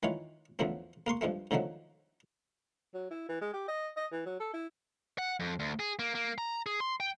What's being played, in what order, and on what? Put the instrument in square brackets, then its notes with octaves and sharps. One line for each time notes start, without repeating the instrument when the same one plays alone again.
[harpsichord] D#3 E3 F4 C#5
E2 A2 D3 F3 F#3 C4
A#3 A#4 C6 C#6
G2 F3 G#3 A3
G#2 D3 D#3 F3 F#3 A3
[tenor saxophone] F#3
E4
E3
G#3
G4
D#5
D#5
E3
F#3
A4
E4
[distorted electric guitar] F#5
F2
D2
G#4
A#3
A#3
A#5
G#4
C6
G5